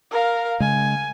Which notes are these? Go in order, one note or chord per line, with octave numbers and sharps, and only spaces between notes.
A#4 F5
C#3 G#3 G#5